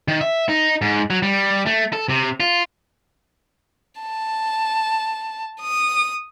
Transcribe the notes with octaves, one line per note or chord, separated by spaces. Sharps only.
D#3
E5
D#4
G#2
F#3
G3
A3
A4
C3
F4
A5
D#6